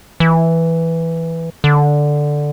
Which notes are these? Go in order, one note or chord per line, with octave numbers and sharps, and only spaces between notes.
E3
D3